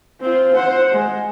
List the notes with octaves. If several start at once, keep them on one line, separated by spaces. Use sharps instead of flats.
C4 F4
C5 F#5
G#3